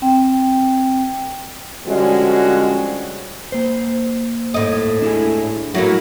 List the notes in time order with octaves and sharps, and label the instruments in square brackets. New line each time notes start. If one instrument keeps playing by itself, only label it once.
[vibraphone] C4 G5
[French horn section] D3 F3 G3 G#3 C#4 F#4
[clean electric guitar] A#3 C5
[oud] D#2 A2 D#5
[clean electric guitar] D4 E4 G#4
[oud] F#3 A3 A#3 [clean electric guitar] E4